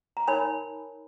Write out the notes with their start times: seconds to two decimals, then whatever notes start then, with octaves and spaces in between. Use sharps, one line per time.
0.17 A#5
0.28 D#4 A#4 C#5 G#5 B5